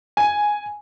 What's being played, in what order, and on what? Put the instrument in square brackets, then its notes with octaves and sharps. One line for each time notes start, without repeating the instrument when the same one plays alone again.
[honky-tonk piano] G#5